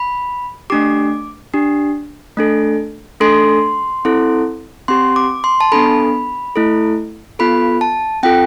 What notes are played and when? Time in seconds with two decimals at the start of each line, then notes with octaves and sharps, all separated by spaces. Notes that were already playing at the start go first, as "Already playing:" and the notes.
Already playing: B5
0.70 A3 D4 G4 D6
1.54 D4 G4
2.37 A3 D4 A4
3.21 A3 D4 A4 C6
4.05 C4 E4 A4
4.88 C4 G4 C6
5.16 D6
5.44 C6
5.61 A5
5.72 B3 D4 A4 B5
6.56 A3 E4 A4
7.39 B3 F4 A4 B5
7.81 A5
8.23 C4 F4 A4 G5